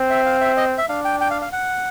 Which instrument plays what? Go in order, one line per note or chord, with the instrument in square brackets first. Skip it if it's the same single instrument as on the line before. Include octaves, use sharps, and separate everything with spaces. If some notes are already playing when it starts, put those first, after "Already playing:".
Already playing: [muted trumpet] C4
[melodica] E5
F5
E5
D#5
E5
[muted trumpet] D4 [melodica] F5
[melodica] G5
G5
F5
F5
F#5